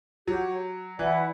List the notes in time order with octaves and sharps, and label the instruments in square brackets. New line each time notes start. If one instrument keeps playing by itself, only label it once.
[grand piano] F#3 [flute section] G4 C#5 F#5
[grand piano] E3 [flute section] E4 B4 D5 F#5